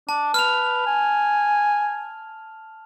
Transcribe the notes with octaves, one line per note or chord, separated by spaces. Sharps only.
D4 A5
B4 F6 F7
G#5